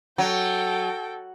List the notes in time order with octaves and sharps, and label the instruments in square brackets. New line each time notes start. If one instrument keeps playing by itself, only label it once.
[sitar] F#3 [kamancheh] A4 G5